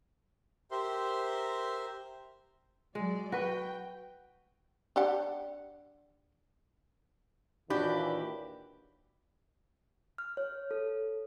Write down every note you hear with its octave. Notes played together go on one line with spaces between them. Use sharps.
G4 A#4 C5 E5 C6
F#3 G#3 D5
F#4 B4 G5
D4 G4 F#5
D#2 A#2 E3 D4 F#4 G4 B5
F6
C#5
A4